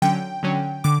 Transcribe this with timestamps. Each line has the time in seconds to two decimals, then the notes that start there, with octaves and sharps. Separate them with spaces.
0.02 D3 F#3 C#4 G5
0.43 D3 F#3 C#4
0.84 D3 D6